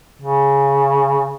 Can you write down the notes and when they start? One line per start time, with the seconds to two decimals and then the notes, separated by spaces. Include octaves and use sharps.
0.22 C#3